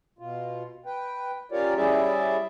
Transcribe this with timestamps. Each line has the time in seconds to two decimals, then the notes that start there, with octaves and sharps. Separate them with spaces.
0.19 B2 F4
0.86 B4 G5
1.52 C#4 F4 G4 A#4 C#5 D5
1.76 G3 C#4 E4 G#4 D5 E5